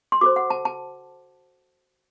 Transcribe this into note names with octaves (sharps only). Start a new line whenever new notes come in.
C6
F#4 A4 C5 D6
F#5
A5
A5